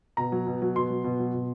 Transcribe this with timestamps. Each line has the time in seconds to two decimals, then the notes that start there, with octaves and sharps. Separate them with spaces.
0.17 B2 A#5
0.32 F#3
0.47 B2
0.62 F#3
0.76 B2 C6
0.90 F#3
1.04 B2
1.19 F#3
1.34 B2